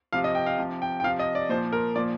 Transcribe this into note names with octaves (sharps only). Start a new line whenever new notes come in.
C3 F3 F5
D#5
G5
F5
C3 F3
G5
G5
C3 F3 F5
D#5
D5
A#2 F3 C5
A#4
A#2 F3 D5